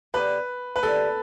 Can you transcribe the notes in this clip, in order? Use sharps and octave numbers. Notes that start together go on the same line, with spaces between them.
D3 B3 G4 B4
B4
D3 G3 E4 A4